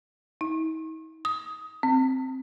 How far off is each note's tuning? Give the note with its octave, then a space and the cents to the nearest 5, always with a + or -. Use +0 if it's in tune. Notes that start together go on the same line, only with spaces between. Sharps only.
D#4 +45
D#6 +15
C4 +0